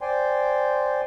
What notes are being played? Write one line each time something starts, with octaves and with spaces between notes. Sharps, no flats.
C5 D5 G5 G#5 C6